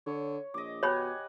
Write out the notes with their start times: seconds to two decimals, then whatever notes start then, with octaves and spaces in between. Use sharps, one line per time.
0.06 D3 C#5
0.54 A#1 D#5 D6
0.83 B2 G4 C#5 F#5 G#5 B5